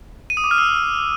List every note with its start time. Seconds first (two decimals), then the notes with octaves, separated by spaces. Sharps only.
0.30 D#7
0.37 D#6
0.44 D6
0.51 F6
0.58 E6